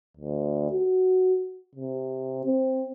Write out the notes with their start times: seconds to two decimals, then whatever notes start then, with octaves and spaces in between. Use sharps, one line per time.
0.17 D2
0.71 F#4
1.75 C3
2.45 C4